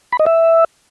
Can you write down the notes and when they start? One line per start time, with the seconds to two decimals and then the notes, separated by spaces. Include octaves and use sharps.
0.12 B5
0.19 D#5
0.26 E5